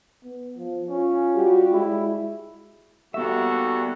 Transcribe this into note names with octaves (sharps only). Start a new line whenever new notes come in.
B3
F3
C#4 F4
G3 F#4 G4
G#3 E4
D#2 G3 B3 F#4 A4 E5